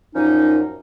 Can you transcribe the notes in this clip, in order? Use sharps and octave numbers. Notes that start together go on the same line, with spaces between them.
F#2 A#2 F3 C#4 D#4